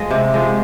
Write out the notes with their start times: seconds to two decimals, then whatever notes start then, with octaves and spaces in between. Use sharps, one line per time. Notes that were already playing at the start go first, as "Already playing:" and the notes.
Already playing: F3 G#3 D#5
0.11 C3
0.34 F3 G#3